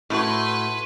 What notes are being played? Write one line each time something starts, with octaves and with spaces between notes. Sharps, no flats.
A2 E4 F#4 B4 C6